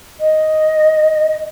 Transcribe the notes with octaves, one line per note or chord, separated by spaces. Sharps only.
D#5